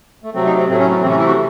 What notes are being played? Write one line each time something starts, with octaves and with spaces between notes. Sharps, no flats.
A3
C3 F#3 A3 C4
D#4
C4
A2 F#3 A3 C4
C#4
A3
C3 E3 A3 C4
C#4
E4
F#4